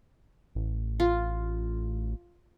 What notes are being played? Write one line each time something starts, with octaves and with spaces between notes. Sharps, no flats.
A1
F4